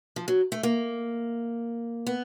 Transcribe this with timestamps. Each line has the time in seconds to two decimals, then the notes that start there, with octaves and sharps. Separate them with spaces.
0.16 F3
0.28 F#3
0.52 A3
0.63 A#3
2.07 B3